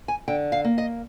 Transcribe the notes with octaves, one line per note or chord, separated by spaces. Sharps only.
G#5
D3 G5
F5
A#3
D#5